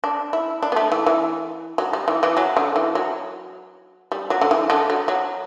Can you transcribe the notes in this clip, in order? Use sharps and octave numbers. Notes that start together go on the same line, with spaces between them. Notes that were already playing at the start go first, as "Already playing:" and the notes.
D4
E4
D4
B3
A3
E3
E3
F#3
G3
E3
E3
F#3
D3
E3
F#3
G3
F#3
D3
E3
D3
F#3
F#3